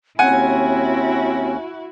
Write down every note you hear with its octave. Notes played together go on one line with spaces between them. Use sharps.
D#2 C4 C#4 E4 F#4 F#5 G#5